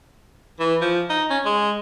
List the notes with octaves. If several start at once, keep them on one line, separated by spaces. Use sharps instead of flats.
E3
F3
D#4
C#4
G#3